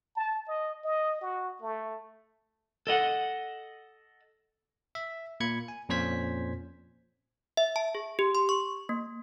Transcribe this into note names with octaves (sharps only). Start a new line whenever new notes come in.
A5
D#5
D#5
F#4
A3
A4 D#5 F#5
E5
A#2 A#3 B5 G#6 C#7
G#5
F2 A#2 C#4 C5 G#6 B6
E5
A5
G#4
G4
C6
C#6
A#3